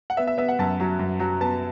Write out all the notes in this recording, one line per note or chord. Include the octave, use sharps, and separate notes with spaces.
F#5
B3 E5
E5
B3 E5
F#5
F#2 A5
F#3
F#2
F#3
B3 A5